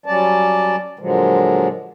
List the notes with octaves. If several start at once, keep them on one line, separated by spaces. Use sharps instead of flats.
F#3 G3 C#4 D5 A5
A#2 D3 F3 F#3 G#3